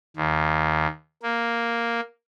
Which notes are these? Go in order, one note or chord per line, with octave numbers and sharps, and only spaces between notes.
D#2
A#3